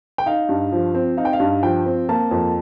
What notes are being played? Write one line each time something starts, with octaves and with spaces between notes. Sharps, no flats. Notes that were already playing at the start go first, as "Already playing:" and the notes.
G5
D#4 F5
G2
F3
C4
D#4 F5
G5
F5
G2
F3 G5
C4
A#3 A5
F2